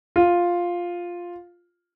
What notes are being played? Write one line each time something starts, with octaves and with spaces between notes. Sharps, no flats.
F4